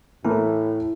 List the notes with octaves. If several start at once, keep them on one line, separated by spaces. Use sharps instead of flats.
A2 E3 A3 E4 A#4